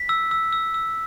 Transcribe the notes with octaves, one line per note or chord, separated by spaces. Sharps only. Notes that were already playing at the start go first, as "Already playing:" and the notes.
Already playing: B6
E6
E6
E6
E6